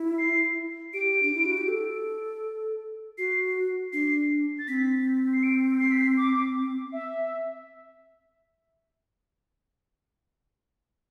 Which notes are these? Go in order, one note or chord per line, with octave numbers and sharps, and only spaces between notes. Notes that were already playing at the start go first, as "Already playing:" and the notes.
Already playing: E4
C7
G4 D7
D4
E4
F#4
G4
A4
F#4 C7
D4 C7
A6
C4 B6
C7
D7
C7
B6
C7
D6
E5